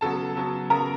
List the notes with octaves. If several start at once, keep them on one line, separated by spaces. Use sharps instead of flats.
C#3 F#3 B3 A4 A5
C#3 F#3 B3
C#3 F#3 B3 A#4 A#5